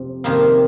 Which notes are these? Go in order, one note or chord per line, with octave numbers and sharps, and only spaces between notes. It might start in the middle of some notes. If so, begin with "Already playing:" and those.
Already playing: F2 C3
F2 C3 D#3 A#3